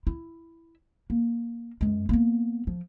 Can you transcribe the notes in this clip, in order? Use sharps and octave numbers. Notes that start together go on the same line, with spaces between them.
E4
A#3
F#2 G#3
A#3 B3
F3